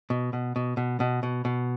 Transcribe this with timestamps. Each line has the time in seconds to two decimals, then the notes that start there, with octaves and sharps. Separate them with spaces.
0.10 B2
0.33 B2
0.56 B2
0.77 B2
1.00 B2
1.23 B2
1.45 B2